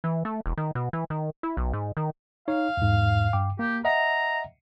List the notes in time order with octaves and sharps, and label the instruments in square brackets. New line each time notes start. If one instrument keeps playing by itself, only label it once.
[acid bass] E3
A3
E1
D#3
B2
E3
D#3
E4
B1
G#2
D#3
[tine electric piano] D#4 C#5 [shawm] F5
[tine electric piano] E2 G#2
G2 G5 D6
[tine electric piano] A#3 [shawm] G4
[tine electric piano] D#5 E5 F#5 [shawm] A#5